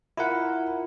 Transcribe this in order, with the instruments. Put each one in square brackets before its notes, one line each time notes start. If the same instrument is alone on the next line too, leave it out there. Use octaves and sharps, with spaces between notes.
[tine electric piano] E4 F4 A#4 F#5